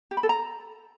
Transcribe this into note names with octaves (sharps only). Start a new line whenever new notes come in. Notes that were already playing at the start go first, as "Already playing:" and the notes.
G4
B5
A4
A#5